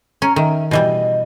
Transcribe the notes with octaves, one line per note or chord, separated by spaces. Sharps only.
C#4 A#5
D#3 E5
B2 E3 G3 D#5